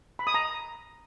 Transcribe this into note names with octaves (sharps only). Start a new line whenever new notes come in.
B5
D#6
A#5